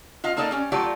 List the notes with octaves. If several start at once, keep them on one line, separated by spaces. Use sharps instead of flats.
F4 D#5 F5
A#3 D#4 A4 D5 D#5
G3 C#4
F#3 A3 F4 G4 D5